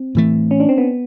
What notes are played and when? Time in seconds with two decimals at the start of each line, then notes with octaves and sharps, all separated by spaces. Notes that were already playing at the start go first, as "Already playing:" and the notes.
Already playing: C4
0.15 A2 E3 A3
0.51 C#4
0.60 D4
0.69 C4
0.78 B3